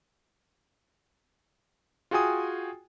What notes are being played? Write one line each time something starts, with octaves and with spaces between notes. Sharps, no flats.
F4 F#4 G#4 G5 G#5 D#6